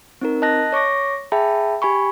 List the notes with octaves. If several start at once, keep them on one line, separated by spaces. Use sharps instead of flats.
C4 D#4 A#4
D#5 A5 F#6 A#6
C#5 C#6 D6 A#6
G#4 E5 G5 A5 B5
G4 G#5 B5 C#6